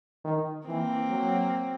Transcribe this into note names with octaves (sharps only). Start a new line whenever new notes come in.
D#3
E3 A#3 C4
F#3